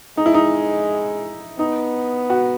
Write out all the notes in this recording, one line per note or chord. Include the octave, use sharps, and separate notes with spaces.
G#3 D#4
E4
D#4
B3 D#4
F#4